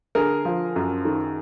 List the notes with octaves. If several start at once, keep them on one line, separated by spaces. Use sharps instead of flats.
D3 G#4 A#4
F3
F#2
D#3